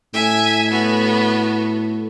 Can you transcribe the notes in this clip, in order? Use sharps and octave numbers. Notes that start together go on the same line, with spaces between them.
A2 E5 G#5
B3 F#4